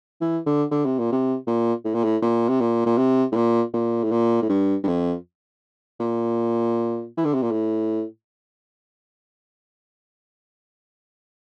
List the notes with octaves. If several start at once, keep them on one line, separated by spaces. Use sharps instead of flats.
E3
D3
D3
C3
A#2
C3
A#2
A2
A#2
A2
A#2
C3
A#2
A#2
C3
A2
A#2
A#2
A2
A#2
A2
G2
G2
F2
A#2
E3
D3
C3
A#2
A2